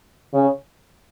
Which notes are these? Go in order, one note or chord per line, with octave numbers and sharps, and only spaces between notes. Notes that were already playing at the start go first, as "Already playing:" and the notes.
C#3